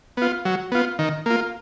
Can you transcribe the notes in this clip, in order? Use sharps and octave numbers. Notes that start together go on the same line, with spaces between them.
B3 F4
F#3
B3 F4
D#3
A#3 F4